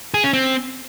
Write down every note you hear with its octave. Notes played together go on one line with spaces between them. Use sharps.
G#4
C#4
C4